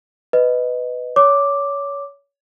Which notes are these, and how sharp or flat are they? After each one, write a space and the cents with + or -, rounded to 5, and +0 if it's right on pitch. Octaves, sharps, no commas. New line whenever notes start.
B4 +10 D#5 +0
C#5 +25 D6 +0